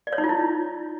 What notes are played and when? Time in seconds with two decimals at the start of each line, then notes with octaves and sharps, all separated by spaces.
0.07 D5
0.13 C#5
0.18 D#4
0.24 F4
0.29 E4